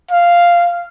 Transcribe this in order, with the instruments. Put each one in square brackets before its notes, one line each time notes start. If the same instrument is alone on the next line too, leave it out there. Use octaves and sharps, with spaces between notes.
[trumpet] F5